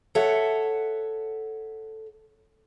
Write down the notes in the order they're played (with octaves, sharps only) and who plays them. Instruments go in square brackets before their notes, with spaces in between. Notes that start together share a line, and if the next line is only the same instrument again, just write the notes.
[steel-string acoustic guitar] A4 C#5 E5 F#5